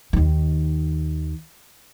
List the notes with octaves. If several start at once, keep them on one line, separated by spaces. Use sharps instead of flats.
D#2 D#3